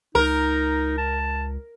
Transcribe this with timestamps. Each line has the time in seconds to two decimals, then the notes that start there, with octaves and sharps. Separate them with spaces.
0.15 C#2 D#4 A#4
0.98 A5